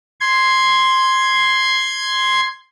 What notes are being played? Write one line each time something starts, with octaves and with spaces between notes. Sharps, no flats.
C6 G#6